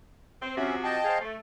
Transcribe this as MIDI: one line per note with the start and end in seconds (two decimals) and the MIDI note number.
0.42 0.52 60
0.58 0.99 48
0.58 0.99 53
0.58 0.75 61
0.58 0.99 66
0.58 0.75 76
0.84 1.18 75
0.84 1.18 79
0.84 1.18 81
1.05 1.18 68
1.05 1.18 72
1.05 1.18 77
1.22 1.35 57